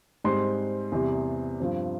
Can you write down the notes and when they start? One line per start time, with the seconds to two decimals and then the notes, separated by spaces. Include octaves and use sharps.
0.24 G#2 G3 C4 C6
0.92 E2 C3 G3
1.60 G2 F3 C4